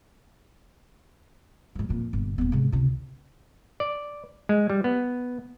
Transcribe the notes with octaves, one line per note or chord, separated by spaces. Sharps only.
G#2 F3
F2 A#2
G1 A#2
D#1 B3
G#2 C3
C#2 C3
D5
G#3
G3
B3